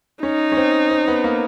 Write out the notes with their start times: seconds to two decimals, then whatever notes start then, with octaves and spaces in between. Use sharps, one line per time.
0.23 C#4 D#4
0.52 C#4
0.57 C4
0.90 C4
1.08 B3
1.24 A#3